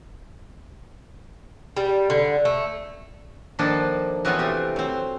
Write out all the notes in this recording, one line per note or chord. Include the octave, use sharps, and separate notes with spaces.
G3
D3
A3
D#3 F3 A#3 D4 A4
E3 F#3 B3 C4 F4 F#4
C3 A3 G4
F#3 C4